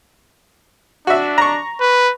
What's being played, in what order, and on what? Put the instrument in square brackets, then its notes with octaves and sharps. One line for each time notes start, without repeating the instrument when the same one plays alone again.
[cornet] D4 [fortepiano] F#4 E5
[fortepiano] A#5 C#6
[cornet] B4